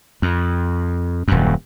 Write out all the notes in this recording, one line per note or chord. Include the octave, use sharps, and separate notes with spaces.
F2
D#1 F#2